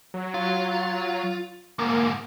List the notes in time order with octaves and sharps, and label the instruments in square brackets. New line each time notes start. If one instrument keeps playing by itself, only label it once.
[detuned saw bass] F#3
[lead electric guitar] F4
[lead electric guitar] D2 G#2 [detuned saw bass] A#3